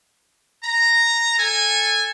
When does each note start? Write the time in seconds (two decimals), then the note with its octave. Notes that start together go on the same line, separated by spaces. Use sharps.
0.64 A#5
1.38 A4 G#5